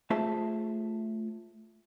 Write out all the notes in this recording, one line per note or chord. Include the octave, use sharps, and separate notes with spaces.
A3 F4 G#4 C5 E5 A5